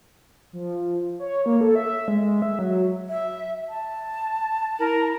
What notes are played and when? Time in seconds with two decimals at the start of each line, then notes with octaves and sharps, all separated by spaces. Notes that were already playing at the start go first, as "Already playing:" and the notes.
0.53 F3
1.19 C#5
1.46 A#3
1.61 A4
1.75 E5
2.08 G#3
2.42 E5
2.59 F#3
3.09 E5
3.69 A5
4.79 E4 A#4